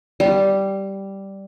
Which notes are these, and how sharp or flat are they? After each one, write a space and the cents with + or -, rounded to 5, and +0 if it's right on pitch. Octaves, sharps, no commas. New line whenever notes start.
G3 -5 C6 +35